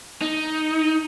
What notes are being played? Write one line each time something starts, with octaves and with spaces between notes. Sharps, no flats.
D#4